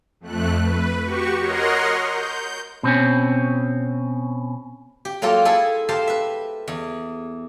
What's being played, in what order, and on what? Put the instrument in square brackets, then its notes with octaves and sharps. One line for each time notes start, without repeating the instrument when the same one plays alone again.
[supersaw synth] F2 A3 F#6
B4
F#4 G4 C#6
A#4 C#5 D#5 F#5 A#5 C6
G6
[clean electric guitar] B2 C4 C#4
[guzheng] G4
F#3 A#3 F4 A4 G5 A#5
E4 G#4 A4 G#5
G4 C5 F5 A5 A#5
B4 E5
E2